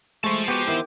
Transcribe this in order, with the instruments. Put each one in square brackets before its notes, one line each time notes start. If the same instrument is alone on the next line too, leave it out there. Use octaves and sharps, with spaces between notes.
[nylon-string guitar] G#3 [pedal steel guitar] A3 [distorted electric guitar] C5 A5 [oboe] C#6
[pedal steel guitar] B3 F#4 [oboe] G4
[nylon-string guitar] D#3 [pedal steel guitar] E3 B3 E4